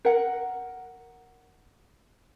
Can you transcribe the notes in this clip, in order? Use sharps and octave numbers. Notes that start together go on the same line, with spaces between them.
A#4 F#5